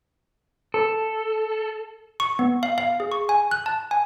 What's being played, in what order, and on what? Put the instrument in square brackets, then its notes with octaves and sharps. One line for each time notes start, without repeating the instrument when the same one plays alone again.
[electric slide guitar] A4
[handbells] C#6
B3
F5
F5
G#4
C#6
G#5
F#6
A5
G#5